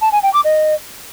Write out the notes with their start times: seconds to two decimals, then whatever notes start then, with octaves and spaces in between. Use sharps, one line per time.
0.01 A5
0.12 G#5
0.23 G5
0.33 D6
0.44 D#5